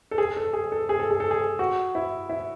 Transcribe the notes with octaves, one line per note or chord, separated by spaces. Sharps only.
A4
G#4
A4
G#4
A4
G#4
A4
G#4
A4
G#4
F#4
E4
E4